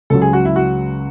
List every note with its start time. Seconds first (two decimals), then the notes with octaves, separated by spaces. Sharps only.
0.10 C#2 C#3 F#3 A4
0.22 G#4
0.33 F#4
0.45 E4
0.56 F#4